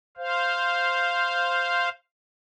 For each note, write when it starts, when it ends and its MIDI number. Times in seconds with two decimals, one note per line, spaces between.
0.17 1.89 72
0.17 1.89 77